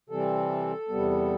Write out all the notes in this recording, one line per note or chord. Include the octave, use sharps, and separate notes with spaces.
C3 E3 G3 C4 A4
E2 C3 G3 B3